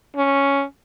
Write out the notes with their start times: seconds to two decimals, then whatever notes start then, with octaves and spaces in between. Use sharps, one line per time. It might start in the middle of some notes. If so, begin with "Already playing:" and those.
0.16 C#4